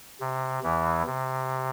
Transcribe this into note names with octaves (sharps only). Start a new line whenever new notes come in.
C3
E2 E3
C3